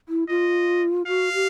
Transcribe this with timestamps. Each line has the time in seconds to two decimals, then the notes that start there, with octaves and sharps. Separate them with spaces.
0.09 E4
0.28 F4 D#5
1.07 F#4 F5
1.33 G4